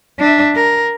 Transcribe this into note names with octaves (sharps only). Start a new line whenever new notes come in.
D4 E5
A#4